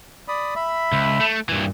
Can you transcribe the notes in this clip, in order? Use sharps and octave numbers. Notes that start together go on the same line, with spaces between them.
D5 B5 D#6
E5 B5
C#2
A3
G2 A#2 E3